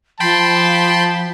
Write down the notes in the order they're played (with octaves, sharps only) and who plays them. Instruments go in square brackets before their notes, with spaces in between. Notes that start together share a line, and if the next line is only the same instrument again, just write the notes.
[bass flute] F3 [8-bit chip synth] G5 B5 C6 [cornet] A5